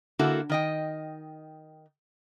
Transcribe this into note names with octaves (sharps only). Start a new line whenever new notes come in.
D3 A#3 E4 F#4 A4
D#3 D#5 G5